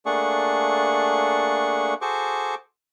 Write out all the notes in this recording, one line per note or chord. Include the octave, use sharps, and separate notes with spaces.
A3 A#3 D4 G#4 F#5 C#6
F#4 G#4 A4 C5 C#6 D6